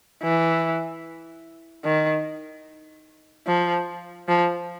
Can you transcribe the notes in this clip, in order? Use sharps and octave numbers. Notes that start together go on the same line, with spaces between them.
E3
D#3
F3
F3